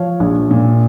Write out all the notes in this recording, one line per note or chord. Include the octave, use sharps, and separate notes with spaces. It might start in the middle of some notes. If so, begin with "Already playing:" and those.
Already playing: F3 C#5 F5
A#1
A#2